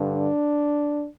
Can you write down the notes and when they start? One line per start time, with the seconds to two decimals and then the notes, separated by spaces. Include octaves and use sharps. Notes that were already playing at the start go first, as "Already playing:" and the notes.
Already playing: G2 D3
0.12 D4